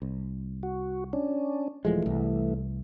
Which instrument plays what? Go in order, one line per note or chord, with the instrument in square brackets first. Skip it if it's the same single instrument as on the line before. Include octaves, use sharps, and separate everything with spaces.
[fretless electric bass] C2
[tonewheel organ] F#4
C#4 D4
[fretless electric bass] D#1 F3 G#3 [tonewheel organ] E3 A3
[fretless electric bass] C2